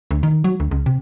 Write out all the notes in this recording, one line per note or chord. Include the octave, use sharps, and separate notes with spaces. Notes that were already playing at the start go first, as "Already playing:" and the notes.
D2
D#3
F#3
D2
C#2
C3